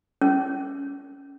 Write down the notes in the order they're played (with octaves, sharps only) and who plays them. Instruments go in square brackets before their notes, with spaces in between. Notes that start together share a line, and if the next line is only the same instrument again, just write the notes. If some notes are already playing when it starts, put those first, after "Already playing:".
[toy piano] C#4